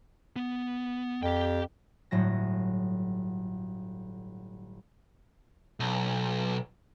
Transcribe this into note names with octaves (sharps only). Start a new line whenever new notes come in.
B3
F2 G4 G5
G1 A2 F#3 A#6
B1